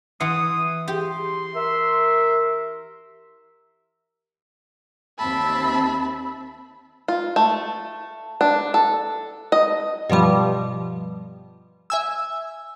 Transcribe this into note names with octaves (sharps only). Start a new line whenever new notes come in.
E3 F#5 C6 D#6
G4 C6
A#4 E5
D#2 C4 E5 A5 B5
F4
A3
D4
A4
D#5
G2 B2 F3 G3
E5 G#5 E6